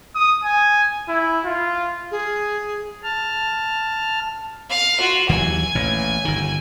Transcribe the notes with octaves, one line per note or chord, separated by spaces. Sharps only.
D#6
G#5
E4
F4
G#4
A5 F6
F5
F4 F#4
D#2 E3 F#3 G#5
A1 A#2
G1 D#3